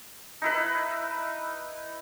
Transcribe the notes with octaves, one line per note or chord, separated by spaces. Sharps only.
D#4 E4 B4